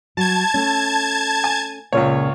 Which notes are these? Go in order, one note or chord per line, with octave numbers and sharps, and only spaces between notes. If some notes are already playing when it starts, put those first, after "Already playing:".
F#3 A5 G#6
A3 C#4
G#5
C#2 A#2 C#3 F4 C#5